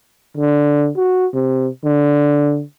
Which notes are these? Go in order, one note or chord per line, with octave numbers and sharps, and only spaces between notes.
D3
F#4
C3
D3